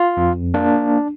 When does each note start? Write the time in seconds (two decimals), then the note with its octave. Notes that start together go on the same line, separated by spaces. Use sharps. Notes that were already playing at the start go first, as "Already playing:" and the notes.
Already playing: F4
0.17 F2
0.54 A#3 D4